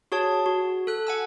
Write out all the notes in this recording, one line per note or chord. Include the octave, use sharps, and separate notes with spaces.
F#4 G#4 C#5 A5
F#4
A4 F#6
F#5 G#5 E6